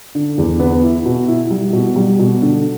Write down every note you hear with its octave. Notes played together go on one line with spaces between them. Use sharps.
D3
E2
B3
E4
B2
E4
G3
B2
G3
B2
D3